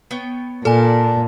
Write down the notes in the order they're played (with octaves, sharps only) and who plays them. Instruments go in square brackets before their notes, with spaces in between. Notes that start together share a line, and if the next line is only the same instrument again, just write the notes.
[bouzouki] B3 C#5 G5
[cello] A#2 [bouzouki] D4 [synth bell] A4 G#5